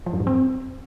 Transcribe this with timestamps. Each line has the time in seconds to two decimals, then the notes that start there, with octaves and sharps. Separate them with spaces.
0.06 F3
0.13 F#2
0.20 G2
0.27 C4